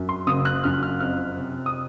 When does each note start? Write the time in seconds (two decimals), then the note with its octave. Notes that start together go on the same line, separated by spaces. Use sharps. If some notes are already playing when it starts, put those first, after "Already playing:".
Already playing: F#2
0.09 C6
0.27 F#1 D#6
0.45 F#6
0.64 F#2 F6
0.83 F6
1.00 F2 F6
1.37 C3
1.66 D#6